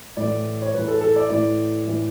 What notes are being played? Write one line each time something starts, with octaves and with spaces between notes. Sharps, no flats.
A2 D5
E3
C#5
A2 E3 B4
A4
A4
D5
A2 E3 D5
A2 E3